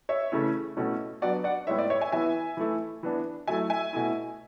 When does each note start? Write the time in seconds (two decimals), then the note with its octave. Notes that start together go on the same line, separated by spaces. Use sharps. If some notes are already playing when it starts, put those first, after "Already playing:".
0.09 C#5 E5
0.32 C#3 E3 A3 C#4 E4
0.76 B2 A3 C#4 E4
1.22 F#3 B3 D4 D5 F#5
1.44 D5 F#5
1.67 A2 G#3 B3 E4 C#5 E5
1.79 D5
1.90 C#5 E5
2.01 E5 G#5
2.12 E3 B3 E4 E5 G#5
2.57 E3 A3 E4
3.03 E3 B3 D4
3.47 F#3 A3 E4 E5 G#5
3.70 E5 G#5
3.93 B2 A3 E4